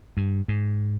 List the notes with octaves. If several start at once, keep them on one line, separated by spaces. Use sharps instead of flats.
G2
G#2